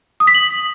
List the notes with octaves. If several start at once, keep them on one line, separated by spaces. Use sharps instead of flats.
D#6
B6
F#7